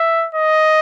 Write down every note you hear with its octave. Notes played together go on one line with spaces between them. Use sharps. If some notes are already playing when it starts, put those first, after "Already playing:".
Already playing: E5
D#5